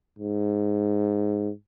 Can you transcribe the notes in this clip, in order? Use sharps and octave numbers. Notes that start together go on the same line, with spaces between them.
G#2